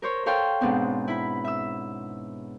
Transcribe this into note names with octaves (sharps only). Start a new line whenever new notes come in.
A#4 C5 C#5
A4 C#5 F5 G5 C6
G#2 B2 B3 C4 D4
E4 B5
E5 E6